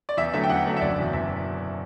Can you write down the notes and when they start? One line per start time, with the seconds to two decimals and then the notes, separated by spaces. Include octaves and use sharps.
0.09 D5
0.17 E2 E5
0.33 D3 F#3 A3 E5
0.44 G5
0.49 E2 F#5
0.65 D3 F#3 A3
0.77 E5
0.81 F#1 D5
0.97 E2 B2 F#3
1.13 F#1 E5